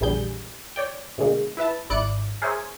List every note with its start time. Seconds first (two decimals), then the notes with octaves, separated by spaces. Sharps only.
0.01 A#1 E2 D3 G3 G#4 G6
0.76 C#5 D5 G5
1.18 B2 D3 G#3 A#3
1.57 E4 B4 E5 A5
1.90 G#1 E4 D5 F#6 C#7 D7
2.42 G#4 A#4 C5 C#5 E5 G#5